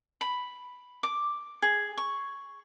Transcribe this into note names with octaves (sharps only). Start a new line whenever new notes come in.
B5
D6
G#4
C#6